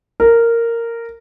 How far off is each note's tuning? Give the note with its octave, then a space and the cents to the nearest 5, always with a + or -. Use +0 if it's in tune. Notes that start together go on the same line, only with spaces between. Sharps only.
A#4 -10